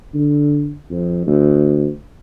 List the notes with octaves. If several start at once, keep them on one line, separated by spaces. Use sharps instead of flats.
D3
F2
D2